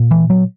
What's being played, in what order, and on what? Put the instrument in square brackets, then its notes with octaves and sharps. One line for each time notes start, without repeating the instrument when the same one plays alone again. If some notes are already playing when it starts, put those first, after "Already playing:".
Already playing: [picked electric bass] A#2
E3
F#3